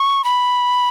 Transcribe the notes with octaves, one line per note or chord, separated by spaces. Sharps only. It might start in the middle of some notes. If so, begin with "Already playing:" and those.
Already playing: C#6
B5